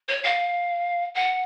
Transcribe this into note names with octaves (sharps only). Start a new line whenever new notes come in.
C#5
F5
F#5